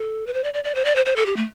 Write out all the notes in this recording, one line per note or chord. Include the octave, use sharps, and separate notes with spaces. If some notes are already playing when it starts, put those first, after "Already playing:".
Already playing: A4
B4
C5
D5
D5
D5
C5
D5
C5
C5
A4
G4
A3